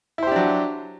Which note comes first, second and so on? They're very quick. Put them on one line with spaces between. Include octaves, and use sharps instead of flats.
E4 C5 G4 D4 F#3